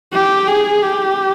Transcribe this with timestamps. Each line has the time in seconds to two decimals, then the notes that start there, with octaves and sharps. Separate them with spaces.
0.13 G4
0.48 G#4
0.82 G4